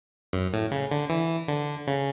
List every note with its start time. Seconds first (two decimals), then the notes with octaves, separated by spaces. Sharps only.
0.33 F#2
0.53 A2
0.72 C#3
0.91 D3
1.10 E3
1.48 D3
1.87 C#3